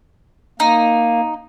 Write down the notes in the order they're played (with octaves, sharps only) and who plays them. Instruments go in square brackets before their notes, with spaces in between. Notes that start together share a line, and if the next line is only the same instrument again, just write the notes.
[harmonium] A#3 [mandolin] D#4